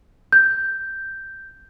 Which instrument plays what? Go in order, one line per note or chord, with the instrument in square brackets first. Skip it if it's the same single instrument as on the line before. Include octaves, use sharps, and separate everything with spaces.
[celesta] G6